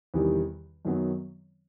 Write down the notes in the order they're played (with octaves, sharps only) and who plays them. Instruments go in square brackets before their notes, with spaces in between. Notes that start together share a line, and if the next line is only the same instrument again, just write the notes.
[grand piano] E2 C3 D#3 G3
F#2 D#3 F#3 B3